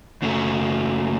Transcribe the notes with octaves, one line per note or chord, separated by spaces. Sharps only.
F#2 C#3 F#3 A3